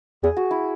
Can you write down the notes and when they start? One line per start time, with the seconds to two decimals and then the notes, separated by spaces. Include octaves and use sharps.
0.23 E2 G#4
0.37 F#4
0.51 E4